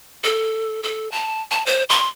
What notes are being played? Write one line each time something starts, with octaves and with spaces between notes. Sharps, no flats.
A4
A4
A5
A5
C5
C6